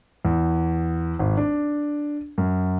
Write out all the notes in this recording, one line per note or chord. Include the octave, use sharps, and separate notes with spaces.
E2
G#1
D4
F#2